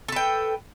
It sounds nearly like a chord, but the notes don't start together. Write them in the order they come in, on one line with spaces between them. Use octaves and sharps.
A4 B4 G5